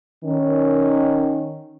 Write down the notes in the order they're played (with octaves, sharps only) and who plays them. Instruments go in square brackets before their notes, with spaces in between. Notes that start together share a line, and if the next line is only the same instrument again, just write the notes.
[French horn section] D#3 C#4